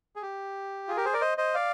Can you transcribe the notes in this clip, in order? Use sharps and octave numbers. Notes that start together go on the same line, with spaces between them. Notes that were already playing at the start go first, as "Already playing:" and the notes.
G#4
G4
F4 G#4
G4 A#4
G#4 C5
A#4 D5
C5 D#5
C5 D#5
D5 F5